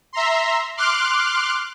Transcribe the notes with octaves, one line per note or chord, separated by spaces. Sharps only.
E5 A#5 C6
C6 D6 F6 F#6